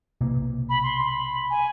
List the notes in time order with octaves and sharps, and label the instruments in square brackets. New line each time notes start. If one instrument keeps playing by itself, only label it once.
[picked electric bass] B1 C3 A#3
[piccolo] B5
C6
B5
G#5